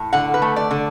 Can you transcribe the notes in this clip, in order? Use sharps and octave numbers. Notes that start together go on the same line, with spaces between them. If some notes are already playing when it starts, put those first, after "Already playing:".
Already playing: A2 A3
D3 F#5
B4
A3
D5
D3